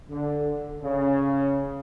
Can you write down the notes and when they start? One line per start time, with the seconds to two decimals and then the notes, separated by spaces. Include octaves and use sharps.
0.10 D3
0.82 C#3